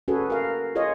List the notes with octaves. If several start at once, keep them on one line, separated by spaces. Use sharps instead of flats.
C#4 F#4 G#4 A4 B4
A#4 F5
F4 G#4 C#5 D#5 F5